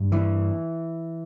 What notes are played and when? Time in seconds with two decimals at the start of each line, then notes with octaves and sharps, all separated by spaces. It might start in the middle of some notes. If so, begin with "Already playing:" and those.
Already playing: G2
0.12 E3